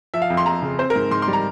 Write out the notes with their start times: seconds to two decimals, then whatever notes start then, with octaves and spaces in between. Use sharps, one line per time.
0.14 F3 E5
0.22 F5
0.30 F2
0.37 C6
0.46 F2 A#5
0.62 C#3
0.79 C4 C5
0.90 A#4
0.95 G#2
1.11 G#2 C6
1.22 C6
1.28 G3
1.33 A#5